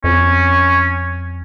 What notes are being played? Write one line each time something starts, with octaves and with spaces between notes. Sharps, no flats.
F2 C#4